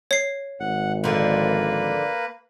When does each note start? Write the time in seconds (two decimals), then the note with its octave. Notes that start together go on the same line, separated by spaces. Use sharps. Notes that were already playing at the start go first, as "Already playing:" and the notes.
0.11 C#5 C7
0.60 G#1 F#5
1.04 D3 F3 A#3 B4